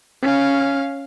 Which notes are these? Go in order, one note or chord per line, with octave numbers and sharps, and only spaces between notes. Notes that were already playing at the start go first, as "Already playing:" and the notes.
C#4 F5